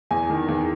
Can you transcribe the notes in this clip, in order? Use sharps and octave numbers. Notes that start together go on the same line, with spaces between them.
E2 G#5
D#3
E2